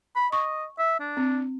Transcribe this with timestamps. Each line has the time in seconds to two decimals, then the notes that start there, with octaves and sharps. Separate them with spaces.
0.16 B5
0.32 D#5 C#6
0.79 E5
1.00 D4
1.17 C4